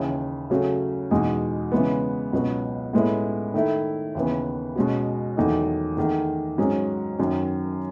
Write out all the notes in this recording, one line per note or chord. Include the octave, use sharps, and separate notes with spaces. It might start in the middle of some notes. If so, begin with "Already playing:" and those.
Already playing: D#2 C#3 E3
C#3 F#3 A3 C#4 F#4
E2 B2 G#3 D#4 G#4
C#3 E3 G#3 B3
C#2 B2 F#3 B3 F#4
A2 G#3 B3 E4
D#3 A3 E4
D#2 C#3 E3 B3
B2 G#3 C#4 F#4
E2 D#3 F#3 A3 D#4
E2 D#3 A3
G#2 F#3 C#4 G#4
F#2 D#3 F#3